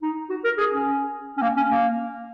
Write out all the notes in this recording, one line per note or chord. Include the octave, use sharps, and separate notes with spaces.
D#4
F#4
A#4
G#4
C#4
C#4
A#3
C#4
A#3